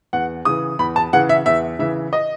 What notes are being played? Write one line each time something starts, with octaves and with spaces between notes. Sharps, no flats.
E2 F#5
C#3 E3 D#6
E2 B5
A5
C#3 E3 F#5
E5
E2 E5
C#3 E3 E5
D#5